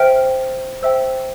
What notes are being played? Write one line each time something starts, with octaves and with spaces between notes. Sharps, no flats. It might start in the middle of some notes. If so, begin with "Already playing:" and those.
Already playing: C5 E5 G5 F6
C5 E5 G5 E6